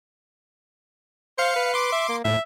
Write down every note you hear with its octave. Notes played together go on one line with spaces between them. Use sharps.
C5 F5 C#7
B4
C6 D6
E5
A#3
A2 E5